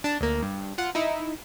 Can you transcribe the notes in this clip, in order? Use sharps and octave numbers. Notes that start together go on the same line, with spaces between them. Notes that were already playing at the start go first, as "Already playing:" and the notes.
D4 A5
D2 A#3
G2
F4 F#5
D#4 E4